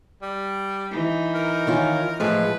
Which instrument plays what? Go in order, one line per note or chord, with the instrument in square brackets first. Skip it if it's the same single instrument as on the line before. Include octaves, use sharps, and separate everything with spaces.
[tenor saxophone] G3
[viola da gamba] E3 D#4
[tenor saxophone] A#4
[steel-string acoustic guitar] D#3 C#4 F4
[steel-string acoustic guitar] A2 F3 G#3 [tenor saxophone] B4